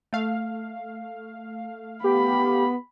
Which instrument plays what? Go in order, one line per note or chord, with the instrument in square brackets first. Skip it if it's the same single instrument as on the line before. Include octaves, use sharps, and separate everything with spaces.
[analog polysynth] A3 F5
[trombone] B3 [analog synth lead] G4 [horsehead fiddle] B5